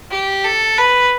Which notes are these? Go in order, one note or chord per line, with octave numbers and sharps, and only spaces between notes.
G4
A4
B4